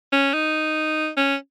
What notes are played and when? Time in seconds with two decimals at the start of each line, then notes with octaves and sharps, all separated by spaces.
0.13 C#4
0.34 D#4
1.17 C#4